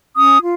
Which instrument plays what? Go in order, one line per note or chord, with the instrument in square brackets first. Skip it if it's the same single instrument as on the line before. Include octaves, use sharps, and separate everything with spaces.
[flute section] C#4 D#6
F4